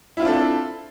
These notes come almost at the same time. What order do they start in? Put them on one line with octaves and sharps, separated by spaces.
E4 F4 C4 D4 A4